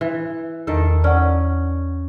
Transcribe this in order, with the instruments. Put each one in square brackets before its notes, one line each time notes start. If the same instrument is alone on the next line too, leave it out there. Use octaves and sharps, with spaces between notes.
[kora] E3
[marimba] E2 [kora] D#3 A4
[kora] C#4 [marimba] D5 F#5